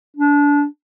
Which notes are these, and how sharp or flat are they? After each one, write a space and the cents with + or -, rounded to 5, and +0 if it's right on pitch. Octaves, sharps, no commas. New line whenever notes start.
D4 -25